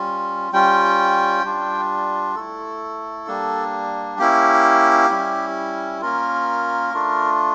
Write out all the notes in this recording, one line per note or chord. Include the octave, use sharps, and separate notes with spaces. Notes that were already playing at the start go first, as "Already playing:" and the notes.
Already playing: G3 C#4 F4
G3 C#4 F4 G5
G3 D4 F4
A3 E4 A4
G3 A#3 D4
A#3 C#4 E4 G4
G3 C#4 E4
A#3 C#4 F4 A#4
A3 D4 F4